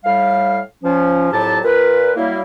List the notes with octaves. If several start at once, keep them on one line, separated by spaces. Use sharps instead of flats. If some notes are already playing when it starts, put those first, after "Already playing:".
A2 G3 F5
F3 C#4
C2 F2 A2 F#3 G4 A5
A#2 A#4 B4
F#3 G3 A#3 E4